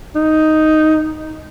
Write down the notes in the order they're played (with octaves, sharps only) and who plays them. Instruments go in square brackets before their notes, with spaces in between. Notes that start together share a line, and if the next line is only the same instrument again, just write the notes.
[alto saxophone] D#4